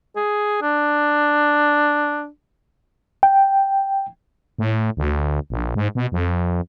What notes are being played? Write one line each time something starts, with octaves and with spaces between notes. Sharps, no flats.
G#4
D4
G5
A2
D2
A#1
G#2
B2
F2